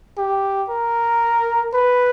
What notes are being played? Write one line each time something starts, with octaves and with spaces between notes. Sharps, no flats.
G4
A#4
B4